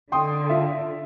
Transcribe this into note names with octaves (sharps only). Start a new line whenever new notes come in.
D3 G5 C6 D#6
F4 E5